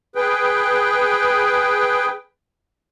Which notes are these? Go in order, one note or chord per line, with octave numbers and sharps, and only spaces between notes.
G#4 B4 G5